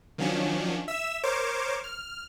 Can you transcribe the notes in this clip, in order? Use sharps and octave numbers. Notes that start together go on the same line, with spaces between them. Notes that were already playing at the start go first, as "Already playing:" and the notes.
D#3 F3 F#3 C#4 D4
E5 E6 E7
A#4 C5 C#5 D6
F6